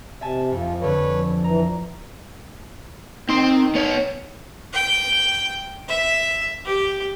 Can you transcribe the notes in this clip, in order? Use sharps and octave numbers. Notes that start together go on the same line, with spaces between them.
C3 E5 G#5 A5
F2 F3
F2 D3 F3 B4 C#5
E3 A#5
D#3 C4 C6
B3 C#5
G5
E5
G4